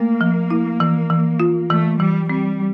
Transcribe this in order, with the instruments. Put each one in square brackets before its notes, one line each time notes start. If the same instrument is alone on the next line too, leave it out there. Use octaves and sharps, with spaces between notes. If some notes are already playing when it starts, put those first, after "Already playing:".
Already playing: [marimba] A3 [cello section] A#3
[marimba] F3
E4
E3
E3
F4
[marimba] E3 [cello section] A3
[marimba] E3 [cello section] G3
[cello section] G3 [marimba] C4